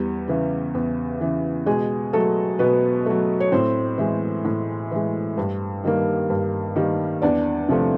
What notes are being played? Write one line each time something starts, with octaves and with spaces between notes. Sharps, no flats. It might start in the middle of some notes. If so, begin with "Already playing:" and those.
Already playing: E2 G3 G4
C#3 E3
E2
C#3 E3
B2 G#3 G#4
F#3 A3 A4
B2 B3 B4
F#3 A3
C#5
A2 C4 C5
E3 G#3
A2
E3 G#3
G2
D#3 G3 A#3
G2
D#3 G3 A#3
E2 D4 D5
C3 F3 A3